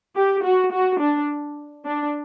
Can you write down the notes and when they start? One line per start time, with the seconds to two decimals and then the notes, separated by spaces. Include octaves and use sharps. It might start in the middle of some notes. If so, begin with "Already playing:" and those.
0.16 G4
0.44 F#4
0.72 F#4
1.00 D4
1.85 D4